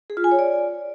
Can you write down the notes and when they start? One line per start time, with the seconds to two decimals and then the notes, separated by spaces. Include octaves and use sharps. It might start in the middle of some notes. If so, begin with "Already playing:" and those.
0.10 G#4
0.17 F4
0.24 G#5
0.31 C#5
0.39 D5